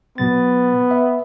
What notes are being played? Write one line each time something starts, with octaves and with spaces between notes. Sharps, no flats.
B2 F#3 B3 A6
E5